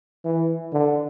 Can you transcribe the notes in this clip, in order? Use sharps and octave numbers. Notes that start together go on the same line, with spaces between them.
E3
D3